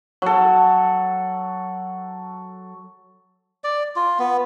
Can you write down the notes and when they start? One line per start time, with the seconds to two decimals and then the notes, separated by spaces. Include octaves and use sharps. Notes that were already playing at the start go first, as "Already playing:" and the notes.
0.22 F#3 A4
3.64 D5
3.96 F4
4.19 B3